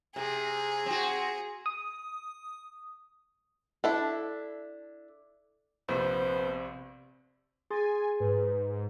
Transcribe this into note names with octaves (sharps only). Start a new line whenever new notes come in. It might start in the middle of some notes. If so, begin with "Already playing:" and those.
C3 G#4
C4 F#4
D#6
D4 E4 A4
A#1 C3 B3 C5
G#4 G#5 C6 A6
G#2 B4